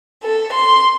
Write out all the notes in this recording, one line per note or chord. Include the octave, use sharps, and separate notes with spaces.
A4
C6